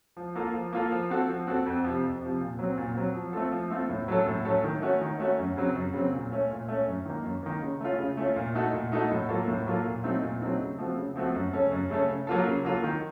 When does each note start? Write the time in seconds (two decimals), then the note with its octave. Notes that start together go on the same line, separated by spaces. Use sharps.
0.17 F3
0.35 A#3 F4 A4
0.54 F3
0.73 A#3 F4 A4
0.92 F3
1.10 C4 F#4 A4
1.29 F3
1.47 C4 F#4 A4
1.66 F2
1.84 C3 F3
2.03 F2
2.22 C3 F3
2.40 A#2
2.59 F#3 C4
2.77 A#2
2.96 F#3 C4
3.15 F3
3.33 A3 C4 F4 A4
3.52 F3
3.71 A3 C4 F4 A4
3.90 A2
4.08 F#3 A3 C#4 A4
4.26 A2
4.45 F#3 A3 C#4 A4
4.64 D#3
4.82 A3 C#4 F#4
5.01 D#3
5.20 A3 C#4 F#4
5.39 F#2
5.57 C#3 F#3 C4
5.75 F#2
5.94 C#3 F#3 C4
6.13 A#2
6.32 A3 C#4
6.51 A#2
6.68 A3 C#4
6.87 F#2
7.05 D#3 A#3
7.24 F#2
7.43 D#3 A#3
7.62 C#3
7.81 A3 C#4 F4
7.98 C#3
8.17 A3 C#4 F4
8.36 A#2
8.55 A3 D#4 F#4 A4
8.73 A#2
8.92 A3 D#4 F#4 A4
9.11 A2
9.29 F#3 A#3 F4 A4
9.48 A2
9.67 F#3 A#3 F4 A4
9.85 A#2
10.04 F#3 A3 C4 D#4
10.23 A#2
10.41 F#3 A3 C4 D#4
10.59 C#3
10.78 F3 A3 C4 F#4
10.97 C#3
11.16 F3 A3 C4 F#4
11.34 F#2
11.53 C#3 A3 C#4 A4
11.72 F#2
11.90 C#3 A3 C#4 A4
12.09 C#3
12.27 F#3 A#3 F4 A4
12.46 C#3
12.65 F#3 A#3 F4 A4
12.84 D#3